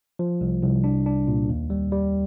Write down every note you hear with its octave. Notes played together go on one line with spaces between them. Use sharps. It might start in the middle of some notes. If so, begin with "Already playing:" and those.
F3
C2
C2
D4
D4
A#2
D#2
G3
G3